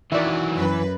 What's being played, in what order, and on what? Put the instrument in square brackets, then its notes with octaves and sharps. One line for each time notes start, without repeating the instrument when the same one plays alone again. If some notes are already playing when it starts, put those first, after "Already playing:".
[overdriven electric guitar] D#3 F#3 [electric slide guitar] E3 [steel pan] A#4 D5 E5
[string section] F#2 B4